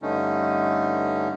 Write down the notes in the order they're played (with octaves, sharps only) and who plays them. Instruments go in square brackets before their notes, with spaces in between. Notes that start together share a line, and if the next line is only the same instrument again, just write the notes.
[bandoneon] G2 D3 A3 C#4 D#4